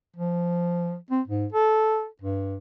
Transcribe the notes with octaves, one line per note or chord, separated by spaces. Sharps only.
F3
C4
G#2
A4
G2